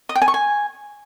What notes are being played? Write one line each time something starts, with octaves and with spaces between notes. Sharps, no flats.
D#5
G5
G#5
C#6
G#5